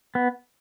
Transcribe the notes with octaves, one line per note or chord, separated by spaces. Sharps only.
B3